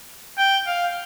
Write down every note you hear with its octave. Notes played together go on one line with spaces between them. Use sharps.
G5
F5